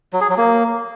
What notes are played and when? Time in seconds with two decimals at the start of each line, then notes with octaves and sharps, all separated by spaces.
0.13 F#3
0.21 G#4
0.29 F#3
0.38 A#3